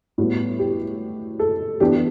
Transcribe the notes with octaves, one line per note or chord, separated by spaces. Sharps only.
A2 G3 B3 F#4
G4
A4
E3 B3 D4 G4